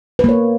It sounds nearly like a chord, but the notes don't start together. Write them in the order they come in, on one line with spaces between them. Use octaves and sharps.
B4 A#3 C#5